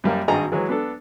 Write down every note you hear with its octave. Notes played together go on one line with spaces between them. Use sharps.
F#2 G3 A#3
G#1 G2 F#4 G#4 D#5 A#5
E3 F#3 G#3
B3 D4 A4